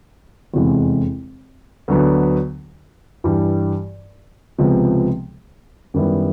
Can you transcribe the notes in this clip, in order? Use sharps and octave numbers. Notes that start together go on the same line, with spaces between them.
F1 E2 C3 E3 G#3
D2 D3 F#3 B3 D4
G2 E3 G3
C#2 C3 F3 G#3 B3
F#2 D#3 G3 B3 E4